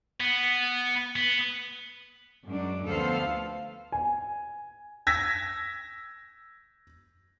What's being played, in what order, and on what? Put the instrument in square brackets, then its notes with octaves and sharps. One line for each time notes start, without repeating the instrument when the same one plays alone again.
[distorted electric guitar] B3
B3
[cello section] F#2 G#3 D4
D2 F3 B3 A4 C5 F5
[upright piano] G#5
[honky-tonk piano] E6 G#6 A#6 B6